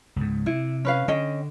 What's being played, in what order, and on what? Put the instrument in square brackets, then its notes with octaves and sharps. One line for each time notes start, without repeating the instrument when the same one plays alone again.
[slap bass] C#2 G#2
[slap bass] C3 [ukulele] E4
[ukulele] C#4 B4 F5
[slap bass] D3 [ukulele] C#4 D#5 G5